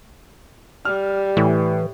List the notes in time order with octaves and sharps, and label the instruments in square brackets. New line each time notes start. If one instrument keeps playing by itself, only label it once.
[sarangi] G3 [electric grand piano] F6
[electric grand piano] A2 [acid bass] E3